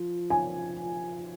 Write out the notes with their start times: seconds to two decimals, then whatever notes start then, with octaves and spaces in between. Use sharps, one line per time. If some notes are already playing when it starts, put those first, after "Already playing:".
Already playing: F3
0.30 G#5